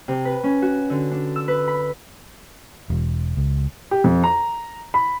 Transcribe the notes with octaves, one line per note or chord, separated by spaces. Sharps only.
C3
B4
C#4
F#4
D3
D4
E6
B4
B5
E1
C#2
G4
F2
A#5
B5